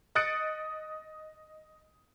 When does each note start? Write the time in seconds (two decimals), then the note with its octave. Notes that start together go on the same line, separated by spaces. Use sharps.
0.15 D#5 D#6 F#6 A6 C#7 D7